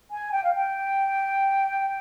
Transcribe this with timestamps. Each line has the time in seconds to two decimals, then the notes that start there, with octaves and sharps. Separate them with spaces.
0.11 G#5
0.32 G5
0.44 F5
0.55 G5